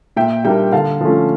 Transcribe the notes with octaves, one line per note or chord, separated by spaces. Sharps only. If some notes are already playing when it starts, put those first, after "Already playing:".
A#2 E5 G5
G3 A#3 D4 E5 G5
D3 F5 A5
F3 A3 C#4